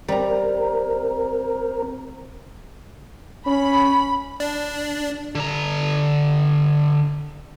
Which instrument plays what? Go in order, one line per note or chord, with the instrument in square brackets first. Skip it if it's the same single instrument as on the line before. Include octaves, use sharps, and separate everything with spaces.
[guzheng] G3 A#5 [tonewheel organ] C4 A#4
[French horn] C#4 [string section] B5
[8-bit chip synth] D4
[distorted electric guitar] D3 A#5